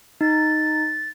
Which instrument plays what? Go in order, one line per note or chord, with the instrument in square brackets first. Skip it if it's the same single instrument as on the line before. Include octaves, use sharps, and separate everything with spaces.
[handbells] D#4 [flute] A6